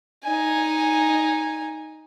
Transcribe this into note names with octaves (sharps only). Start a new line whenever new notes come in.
D#4 G#5